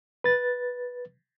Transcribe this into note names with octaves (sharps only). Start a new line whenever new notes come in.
B4 A6